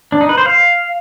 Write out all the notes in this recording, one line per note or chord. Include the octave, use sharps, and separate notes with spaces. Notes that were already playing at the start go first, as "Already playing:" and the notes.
D4
D#4
B4
C5
F5